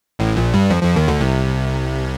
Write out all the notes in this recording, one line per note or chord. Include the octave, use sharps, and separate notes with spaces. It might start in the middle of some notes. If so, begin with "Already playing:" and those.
A1 A2
A#1 A#2
G2 G3
F2 F3
F2 F3
D#2 D#3
D2 D3
C2 C3